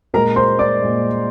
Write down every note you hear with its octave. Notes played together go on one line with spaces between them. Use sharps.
A#2 G#3 A#4 A#5
C5 C6
D5 D6
A#2 G#3